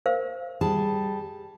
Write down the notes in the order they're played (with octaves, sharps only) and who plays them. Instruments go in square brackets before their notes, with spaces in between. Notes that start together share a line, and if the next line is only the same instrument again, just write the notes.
[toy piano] A#4 C5 F5
[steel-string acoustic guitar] G3 G#4 A5